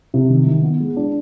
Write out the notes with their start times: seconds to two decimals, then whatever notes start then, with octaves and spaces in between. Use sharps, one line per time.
0.14 C3
0.30 D#3
0.46 D#3
0.63 B3
0.80 G#3
0.97 D4